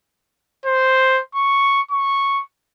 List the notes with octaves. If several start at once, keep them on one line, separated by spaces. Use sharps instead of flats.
C5
C#6
C#6